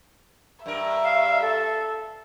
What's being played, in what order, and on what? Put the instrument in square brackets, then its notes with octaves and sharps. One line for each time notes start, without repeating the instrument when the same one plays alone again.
[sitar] G2 A#4 [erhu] E5
[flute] F5
A4